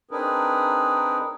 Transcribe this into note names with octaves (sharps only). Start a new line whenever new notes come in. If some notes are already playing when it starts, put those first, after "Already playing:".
C4 D4 D#4 G#4 A#4 B4